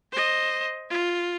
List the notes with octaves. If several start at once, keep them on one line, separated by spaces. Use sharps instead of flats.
C5 D#5
F4